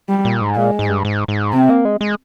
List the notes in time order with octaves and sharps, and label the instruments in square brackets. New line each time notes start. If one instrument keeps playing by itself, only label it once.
[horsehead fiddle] G3
[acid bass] A#2
G#2
[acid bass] A#2 [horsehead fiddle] G#3
[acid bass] G#2
G2
G#2
G#2
[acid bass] C3 [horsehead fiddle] C4
[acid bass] A#3
G#3
G#3